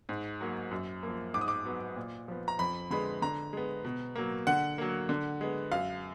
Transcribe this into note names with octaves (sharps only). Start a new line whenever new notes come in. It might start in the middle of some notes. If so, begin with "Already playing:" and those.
G#2
F#3 A#3
F#2
F3 A#3
G#2 D6
D#6
D6
F#3 B3
A#2
F3 B3
A#5
F2 B5
D3 G#3 B3 B5
D3 A#5
G#3 B3
B2
F#3 A#3
D3 F#5
F#3 A#3
D3
G#3 B3
F#2 F5